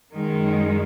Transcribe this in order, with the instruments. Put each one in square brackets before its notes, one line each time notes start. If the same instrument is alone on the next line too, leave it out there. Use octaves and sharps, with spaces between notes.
[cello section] F#2 D#3 G#3